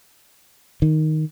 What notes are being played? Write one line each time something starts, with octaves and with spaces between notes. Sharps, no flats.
D#3